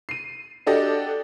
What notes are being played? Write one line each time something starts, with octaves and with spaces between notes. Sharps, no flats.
C7 D#7
D4 F#4 G4 A4 D5 D#5